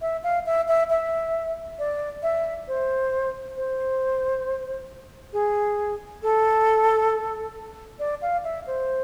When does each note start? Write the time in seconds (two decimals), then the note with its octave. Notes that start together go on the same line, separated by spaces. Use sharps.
0.01 E5
0.23 F5
0.46 E5
0.68 E5
0.90 E5
1.79 D5
2.23 E5
2.68 C5
3.56 C5
5.33 G#4
6.23 A4
7.99 D5
8.22 F5
8.44 E5
8.67 C5